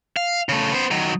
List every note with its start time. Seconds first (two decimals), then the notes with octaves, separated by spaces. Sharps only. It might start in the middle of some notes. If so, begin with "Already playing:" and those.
0.17 F5
0.49 C#3 A3
0.72 B3 C5
0.91 D#3 F#3